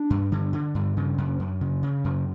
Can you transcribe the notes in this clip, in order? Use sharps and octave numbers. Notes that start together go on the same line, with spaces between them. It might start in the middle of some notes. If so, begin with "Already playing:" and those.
Already playing: D4
G2
D3
D3
G2
C#3
F#2
F#2
C#3
C#3
F#2